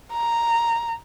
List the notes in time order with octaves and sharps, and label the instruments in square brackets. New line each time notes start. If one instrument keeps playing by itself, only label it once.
[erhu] A#5